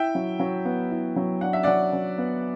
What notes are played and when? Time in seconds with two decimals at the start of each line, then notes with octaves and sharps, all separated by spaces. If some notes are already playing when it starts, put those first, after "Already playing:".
Already playing: E4 E5 G5
0.15 F#3
0.40 F#3
0.65 B3
0.91 E4
1.16 F#3
1.41 D4 F#5
1.53 E5
1.63 F#3 D5 F#5
1.93 F#3
2.18 B3